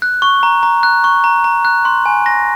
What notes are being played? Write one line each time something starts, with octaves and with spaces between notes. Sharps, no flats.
F#6
C#6
A#5
A#5
F#6
C#6
A#5
A#5
F#6
C6
G#5
A#6